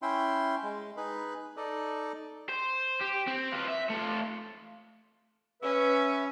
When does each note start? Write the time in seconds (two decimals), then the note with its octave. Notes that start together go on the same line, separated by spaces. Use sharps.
0.02 C#4 E4 E5 G5 C6
0.63 G#3
0.97 D#4 G#4 B4 B5
1.57 D#4 A4 D5 D#5
2.49 C5
3.01 G4
3.27 C4
3.52 F4 B4
3.68 E5
3.90 A3 F4
5.62 C#4 B4 E5 E6